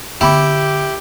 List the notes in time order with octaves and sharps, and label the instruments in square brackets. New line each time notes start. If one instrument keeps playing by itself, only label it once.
[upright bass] D3 B3 [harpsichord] E4 [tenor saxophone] G4 [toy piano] G5 B5 D6